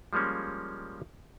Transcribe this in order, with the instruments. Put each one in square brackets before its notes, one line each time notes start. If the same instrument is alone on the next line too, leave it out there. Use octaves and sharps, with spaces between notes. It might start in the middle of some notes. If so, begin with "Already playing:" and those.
[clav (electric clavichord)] F3 G3 G#3 A#3 C#4